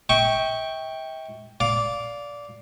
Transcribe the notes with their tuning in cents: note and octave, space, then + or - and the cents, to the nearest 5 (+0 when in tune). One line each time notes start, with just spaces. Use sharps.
E5 -40 G5 +0 C#6 +0
D5 -15 F5 +5